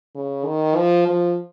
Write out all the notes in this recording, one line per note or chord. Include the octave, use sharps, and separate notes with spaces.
C#3
D#3
F3
F3